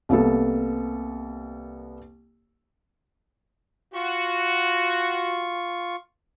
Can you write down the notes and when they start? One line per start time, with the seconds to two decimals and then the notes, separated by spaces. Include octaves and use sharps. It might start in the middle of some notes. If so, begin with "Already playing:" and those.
0.09 C2 A#3 B3 A4
3.94 F4 F#4 C#6